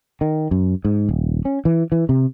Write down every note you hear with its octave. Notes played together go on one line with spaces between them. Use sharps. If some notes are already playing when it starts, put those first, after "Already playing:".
D#3
F#2
G#2
D#1
C#4
E3
E3
C3